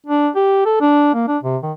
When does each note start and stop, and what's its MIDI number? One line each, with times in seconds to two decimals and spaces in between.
0.06 0.29 62
0.36 0.62 67
0.66 0.77 69
0.81 1.10 62
1.14 1.26 58
1.28 1.38 62
1.43 1.57 48
1.63 1.72 51